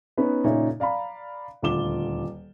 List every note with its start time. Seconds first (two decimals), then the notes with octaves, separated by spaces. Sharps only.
0.17 B3 C#4 D#4 B4
0.44 A#2 C#3 D#4 C#5 E5
0.80 D5 F5 A#5 B5
1.62 D#1 D2 F4 D6 E7 G7